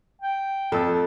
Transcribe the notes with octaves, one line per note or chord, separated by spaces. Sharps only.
G5
F2 A4 E6